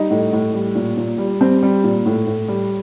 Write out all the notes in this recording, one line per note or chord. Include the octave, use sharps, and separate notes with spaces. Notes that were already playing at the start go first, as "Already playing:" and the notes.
Already playing: G3 D#4
A2
A2
G3
A#2
A#2
G3
G3 C4
G3
A#2
A2
A2
G3